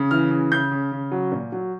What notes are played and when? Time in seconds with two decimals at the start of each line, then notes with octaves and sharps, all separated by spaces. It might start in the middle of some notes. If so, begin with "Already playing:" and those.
Already playing: C#3
0.11 E3 F6
0.31 C#3
0.52 C#3 G6
0.71 C#3
0.92 C#3
1.11 F#3
1.32 A#2
1.52 F#3